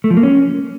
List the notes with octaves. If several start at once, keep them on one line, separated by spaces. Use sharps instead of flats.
A3
F3
A#3
C#4